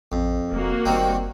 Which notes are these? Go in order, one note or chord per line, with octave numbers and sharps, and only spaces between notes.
A1 F2
E1 A#3 F#4
F#1 D#3 G3 C4